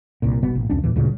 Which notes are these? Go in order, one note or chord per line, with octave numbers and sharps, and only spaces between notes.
C2 A#2
G1 B2 B3
A1
C2 F2 C#4 D4
D#2 A#2 E3
D2 G2 A#2 C#3